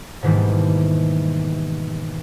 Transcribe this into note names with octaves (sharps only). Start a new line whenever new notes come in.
G#2 B2 D#3 E3 G3 A#3